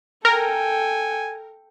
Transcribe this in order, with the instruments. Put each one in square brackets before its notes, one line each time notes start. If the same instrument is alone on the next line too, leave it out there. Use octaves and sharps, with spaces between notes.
[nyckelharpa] A4 G5 [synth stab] A#4 [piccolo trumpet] G#5